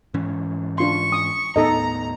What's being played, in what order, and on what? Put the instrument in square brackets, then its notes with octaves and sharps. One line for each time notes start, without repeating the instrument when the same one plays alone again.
[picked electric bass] G#2 E3 C#4
[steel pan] D4 F4 C6 [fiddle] C#6
[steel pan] D#6
[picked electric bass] D#2 A2 B3 [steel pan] D#4 A4 D#5 [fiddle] A#5